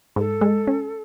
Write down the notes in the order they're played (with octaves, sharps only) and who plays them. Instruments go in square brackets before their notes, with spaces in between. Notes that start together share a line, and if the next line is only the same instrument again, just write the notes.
[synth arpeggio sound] G#2 [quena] A4
[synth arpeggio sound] G#3
C#4